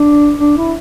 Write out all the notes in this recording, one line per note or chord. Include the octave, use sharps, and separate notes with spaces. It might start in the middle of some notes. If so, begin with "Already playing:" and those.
Already playing: D4
D4
E4